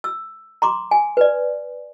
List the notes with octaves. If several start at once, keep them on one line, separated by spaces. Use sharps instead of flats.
E6
A#5 C6 D6
G#5
B4 D5